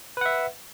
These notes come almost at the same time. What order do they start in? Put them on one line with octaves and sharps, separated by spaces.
B4 F#5 E5